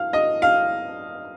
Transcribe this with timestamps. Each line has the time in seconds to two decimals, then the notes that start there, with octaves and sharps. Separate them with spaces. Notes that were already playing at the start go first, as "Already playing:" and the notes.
Already playing: F5
0.13 D#5
0.42 F5